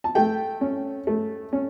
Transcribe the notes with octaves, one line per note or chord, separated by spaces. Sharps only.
A5
A3 G5
C#4
A3
C#4